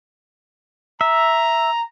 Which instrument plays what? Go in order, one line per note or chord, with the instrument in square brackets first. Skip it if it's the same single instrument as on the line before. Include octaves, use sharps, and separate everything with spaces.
[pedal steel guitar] E5 [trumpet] A#5